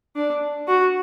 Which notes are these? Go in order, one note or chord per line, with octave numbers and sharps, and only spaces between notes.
D4
F#4